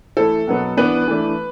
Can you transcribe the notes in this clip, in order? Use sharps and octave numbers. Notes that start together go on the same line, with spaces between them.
E3 A3 E4 A4
B2 F#3 B3
E3 B3 D4 B4
E3 A3 D4